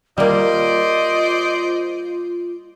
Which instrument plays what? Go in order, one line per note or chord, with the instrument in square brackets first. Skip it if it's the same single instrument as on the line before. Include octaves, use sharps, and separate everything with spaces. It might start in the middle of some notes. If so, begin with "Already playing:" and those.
[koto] G3 A#3 [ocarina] F4 [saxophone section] C5 D5 D#5